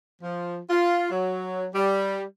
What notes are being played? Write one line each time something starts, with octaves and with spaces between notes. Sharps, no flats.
F3
F4
F#3
G3